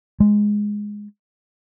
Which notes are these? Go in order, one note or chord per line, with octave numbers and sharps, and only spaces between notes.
G#3